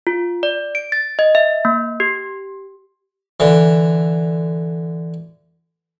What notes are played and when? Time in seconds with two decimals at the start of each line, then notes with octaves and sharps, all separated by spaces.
0.07 F4
0.43 D5
0.75 D7
0.92 A6
1.19 D#5
1.35 E5
1.65 A#3
2.00 G4
3.40 D3 E3